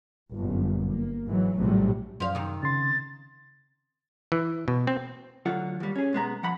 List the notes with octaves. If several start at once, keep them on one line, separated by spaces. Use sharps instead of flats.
G1 F#2 A#2
A#3
G#2 E3 F#3
A#1 A2 C3 F#3 G3
F#2 F3 F5
C3 D#3
C#3 C6 A6
E3
B2
C4
D2 D3 F#3 F4 F#5
D#2 G3
C#4 G#4
B1 G#3 B3 A#5
F3 F#5 B5